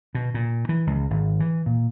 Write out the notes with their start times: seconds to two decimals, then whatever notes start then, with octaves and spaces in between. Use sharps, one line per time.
0.15 B2
0.34 A#2
0.69 E3
0.87 C#2
1.10 G#1
1.40 E3
1.66 A#2